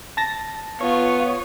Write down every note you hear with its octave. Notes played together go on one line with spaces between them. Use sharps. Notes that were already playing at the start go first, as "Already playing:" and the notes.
A5 A6 A#6
B3 F4 C#5